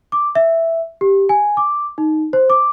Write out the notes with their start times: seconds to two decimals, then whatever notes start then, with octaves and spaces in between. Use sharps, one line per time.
0.12 D6
0.35 E5
1.01 G4
1.29 G#5
1.57 D6
1.98 D#4
2.33 C5
2.50 D6